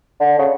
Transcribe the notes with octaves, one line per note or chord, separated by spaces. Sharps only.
D3
C#3